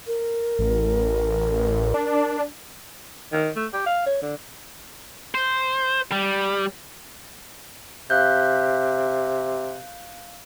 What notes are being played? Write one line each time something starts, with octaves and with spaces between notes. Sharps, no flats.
A#4
A1
D4
D#3
A3
G4
F5
C#5
D3
C5
G3
C3 F5 F#6 G6